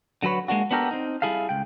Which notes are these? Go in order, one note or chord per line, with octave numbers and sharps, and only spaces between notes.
D3 F#3 F#4 B4 C#5
G#3 A#3 D4 F#4
B3 D4 F#4 G4 A4 A#4
C4 D#4
G3 E4 G#4 A4 F5
C#2 G5